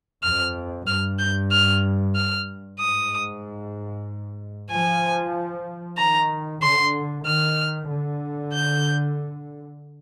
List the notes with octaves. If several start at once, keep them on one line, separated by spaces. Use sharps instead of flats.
F2 F6
G2 F6
G6
F6
F6
G#2 D#6
F3 G#5
D#3 A#5
D3 C6
D#3 F6
D3
G6